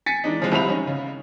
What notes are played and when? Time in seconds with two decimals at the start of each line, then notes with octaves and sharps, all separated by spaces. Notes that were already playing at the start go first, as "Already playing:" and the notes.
0.06 G#5 A6 B6 C#7
0.24 E3 G#3 D4 D#4
0.40 C3 F3 G#3
0.52 C2 F3 C4 E5 B5 F7
0.68 C#4 D#4
0.87 C#3